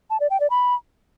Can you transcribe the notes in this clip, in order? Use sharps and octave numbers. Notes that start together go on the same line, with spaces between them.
A5
D5
G5
D5
B5